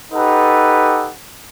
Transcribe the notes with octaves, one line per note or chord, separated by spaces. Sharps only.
D#4 G4 A4 B4 F#5